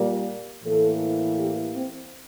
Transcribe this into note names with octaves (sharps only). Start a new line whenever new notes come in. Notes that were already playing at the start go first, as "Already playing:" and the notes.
Already playing: A#2 G3 A#3
A2 E3 A#3 A4
G4
C4